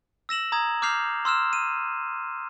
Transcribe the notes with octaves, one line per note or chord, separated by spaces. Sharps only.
E6 A#6 E7 F#7
A#5 D#6 G#6
D6 F6 G6 C7 F7
C6 E6 F6 E7
D#7